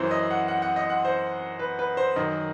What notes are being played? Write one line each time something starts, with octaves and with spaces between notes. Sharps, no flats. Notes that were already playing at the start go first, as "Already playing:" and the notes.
Already playing: F#2 E3 C5
D#5
F#5
F#5
F#5
D#5
F#5
C5
B4
B4
C5
F#2 D#3 D#5